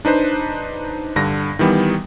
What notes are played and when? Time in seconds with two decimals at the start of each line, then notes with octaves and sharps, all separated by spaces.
0.05 D4 D#4 B4 C5
1.16 G2 D3 A#6
1.59 D#3 E3 G3 B3